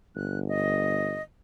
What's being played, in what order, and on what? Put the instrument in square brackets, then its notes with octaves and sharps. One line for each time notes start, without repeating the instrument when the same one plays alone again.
[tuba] G1 [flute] F#6
[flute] D#5